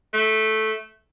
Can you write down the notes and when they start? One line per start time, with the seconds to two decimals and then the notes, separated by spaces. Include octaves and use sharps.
0.13 A3